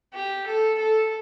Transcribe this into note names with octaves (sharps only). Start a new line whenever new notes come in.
G4
A4
A4